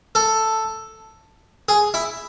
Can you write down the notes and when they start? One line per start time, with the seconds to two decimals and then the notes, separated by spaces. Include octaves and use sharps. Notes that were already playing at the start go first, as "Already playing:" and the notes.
0.15 A4
1.69 G#4
1.94 E4